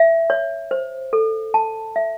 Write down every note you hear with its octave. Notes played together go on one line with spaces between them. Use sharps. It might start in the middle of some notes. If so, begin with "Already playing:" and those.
Already playing: E5
C#5
C5
A4
A5
E5